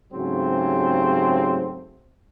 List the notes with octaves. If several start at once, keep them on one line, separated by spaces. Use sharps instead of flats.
G#2 C#3 F#3 A3 C4 G4